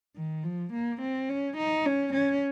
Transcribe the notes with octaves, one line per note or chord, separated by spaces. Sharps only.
D#3
F3
A#3
C4
C#4
D#4
C#4
C#4